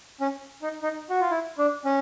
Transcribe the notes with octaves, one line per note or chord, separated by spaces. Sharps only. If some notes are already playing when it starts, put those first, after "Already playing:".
C#4
D#4
D#4
F#4
F4
E4
D4
C#4